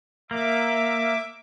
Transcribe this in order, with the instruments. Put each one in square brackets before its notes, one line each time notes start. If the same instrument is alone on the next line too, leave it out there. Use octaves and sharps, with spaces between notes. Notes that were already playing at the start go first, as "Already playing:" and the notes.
[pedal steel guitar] A#3 [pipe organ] E5 D6